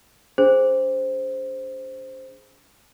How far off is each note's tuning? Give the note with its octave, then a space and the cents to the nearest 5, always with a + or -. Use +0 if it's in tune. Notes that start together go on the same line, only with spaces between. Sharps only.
D4 -45 G#4 +0 C5 +0